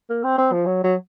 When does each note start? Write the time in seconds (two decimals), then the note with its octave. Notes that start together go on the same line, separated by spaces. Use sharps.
0.10 A#3
0.24 C4
0.38 C4
0.53 F3
0.66 F#3
0.84 F#3